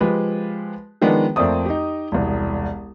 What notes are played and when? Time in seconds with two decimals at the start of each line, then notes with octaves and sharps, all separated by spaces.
0.01 F3 G#3 G4 B4
1.01 D#3 F3 G#3 B3 D4
1.36 F2 A3 A#3 C4 D5 D#6
1.66 D#4 G4
2.12 E1 C2